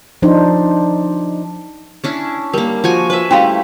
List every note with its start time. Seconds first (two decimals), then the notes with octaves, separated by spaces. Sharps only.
0.22 F3 D4 D#4 C5
2.04 C#4 D4 E4
2.53 G3 A#3 A#4
2.84 F3 F#4 G#5
3.10 B4 C5 E5
3.31 G3 A3 C#4 E4 F#4 F5